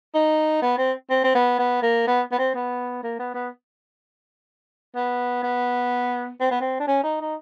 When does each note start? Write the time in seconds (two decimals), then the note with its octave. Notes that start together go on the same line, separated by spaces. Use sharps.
0.15 D#4
0.62 B3
0.78 C4
1.10 C4
1.24 C4
1.35 B3
1.59 B3
1.82 A#3
2.07 B3
2.32 B3
2.38 C4
2.55 B3
3.03 A#3
3.19 B3
3.34 B3
4.95 B3
5.43 B3
6.40 C4
6.51 B3
6.61 C4
6.80 D4
6.88 C#4
7.03 D#4
7.21 D#4